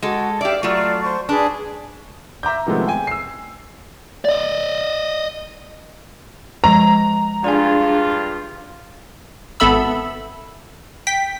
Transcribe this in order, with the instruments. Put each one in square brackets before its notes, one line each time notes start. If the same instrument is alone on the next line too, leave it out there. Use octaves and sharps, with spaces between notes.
[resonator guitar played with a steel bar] G#3 A4 [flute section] F#4
[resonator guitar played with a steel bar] G4 D5 [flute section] E5 F5
[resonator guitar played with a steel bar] F#3 A3 [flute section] F4 D5
[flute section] C5 C#6
[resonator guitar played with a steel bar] D4 [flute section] G#4 B4 D5
[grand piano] E5 A#5 D6 G6
C3 D#3 F3 G#3 A3 B3
G5 G#5
E6 C7
[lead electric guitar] D5 D#5
[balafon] F3 G#3 [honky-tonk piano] A#5
[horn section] G2 F4 [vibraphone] D4 G#4 [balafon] D5 G#5
[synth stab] G#1 B3 A4 E5 B5 E6
G5 B6